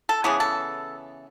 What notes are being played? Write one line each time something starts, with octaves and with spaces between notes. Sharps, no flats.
A4
C#3 E3 B3 G#4
A4